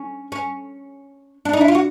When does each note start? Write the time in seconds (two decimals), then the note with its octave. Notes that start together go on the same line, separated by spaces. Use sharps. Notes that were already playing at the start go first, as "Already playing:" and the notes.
Already playing: C#4
0.32 C#4
1.45 D4
1.53 D#4
1.61 E4
1.68 F4
1.75 F#4